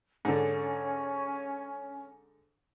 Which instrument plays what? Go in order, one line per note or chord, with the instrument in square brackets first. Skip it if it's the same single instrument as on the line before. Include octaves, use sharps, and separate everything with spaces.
[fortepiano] G#2 D3 [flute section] C#4